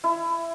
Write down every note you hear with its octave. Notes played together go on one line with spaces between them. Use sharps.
E4